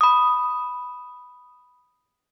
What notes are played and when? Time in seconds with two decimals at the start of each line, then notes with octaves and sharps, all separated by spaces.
0.01 B5 D#6